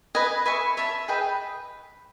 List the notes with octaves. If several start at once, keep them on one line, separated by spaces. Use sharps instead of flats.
B4 D#5 G#5
B4 E5 G#5 C#6
C#5 E5 A5
G#4 B4 D#5 G5